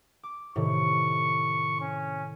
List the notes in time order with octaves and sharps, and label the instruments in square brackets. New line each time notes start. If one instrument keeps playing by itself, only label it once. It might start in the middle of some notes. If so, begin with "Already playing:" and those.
[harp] D6
[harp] A2 C3 D#3 [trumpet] C#6
[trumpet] C#4